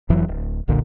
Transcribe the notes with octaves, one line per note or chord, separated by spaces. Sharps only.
F1 F2 E3 F#3
D1
E1 B1 A#2 D3